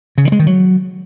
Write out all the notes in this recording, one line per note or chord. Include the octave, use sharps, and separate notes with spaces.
C#3
D#3
G#3
D#3
F#3